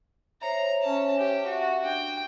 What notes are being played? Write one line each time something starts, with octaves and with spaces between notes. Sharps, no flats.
C5 C#5 E5 A#5
C#4 A5
G4
F#4 E5
D4 G5